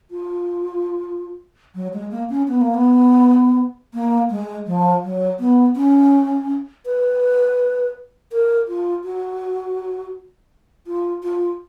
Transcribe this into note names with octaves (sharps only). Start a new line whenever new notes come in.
F4
F#3
G#3
A#3
C#4
B3
A#3
B3
A#3
G#3
F3
F#3
B3
C#4
B4
A#4
F4
F#4
F4
F4